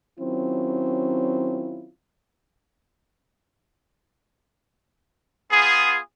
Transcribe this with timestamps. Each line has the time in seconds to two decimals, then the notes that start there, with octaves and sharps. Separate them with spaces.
0.19 D#3 F#3 C4 C#4 E4 F4
5.51 B3 F4 G#4